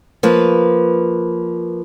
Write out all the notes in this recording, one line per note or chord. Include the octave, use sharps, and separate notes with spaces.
F3 A#3 B4